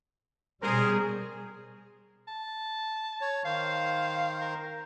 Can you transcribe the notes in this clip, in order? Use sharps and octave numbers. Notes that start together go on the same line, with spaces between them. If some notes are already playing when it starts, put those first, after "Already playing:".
B2 G3 C#4 G#4 A#4 C5
A5
C#5
D#3 C5 F5
A#4